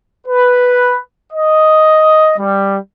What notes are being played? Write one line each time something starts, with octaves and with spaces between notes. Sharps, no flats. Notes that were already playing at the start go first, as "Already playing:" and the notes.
B4
D#5
G3